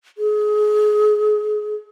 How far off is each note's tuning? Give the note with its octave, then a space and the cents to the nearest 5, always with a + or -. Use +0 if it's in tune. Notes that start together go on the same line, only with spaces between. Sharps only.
G#4 +30